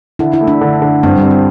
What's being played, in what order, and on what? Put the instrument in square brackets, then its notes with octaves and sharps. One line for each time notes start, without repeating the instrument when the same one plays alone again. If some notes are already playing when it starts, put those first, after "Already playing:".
[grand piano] D3 [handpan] E4
[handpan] E4
[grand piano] A3
[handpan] D4
[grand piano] D3
D3
[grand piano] G2 [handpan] C4
[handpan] G3
[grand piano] C4
[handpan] G3